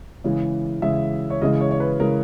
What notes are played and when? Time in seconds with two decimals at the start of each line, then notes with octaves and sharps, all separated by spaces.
0.24 C#3 E3 G#3
0.82 C#3 E3 G#3 E5
1.30 C#5
1.42 C#3 E3 G#3 D#5
1.61 C#5
1.71 C#5
1.80 B4
2.00 C#3 E3 G#3 A#4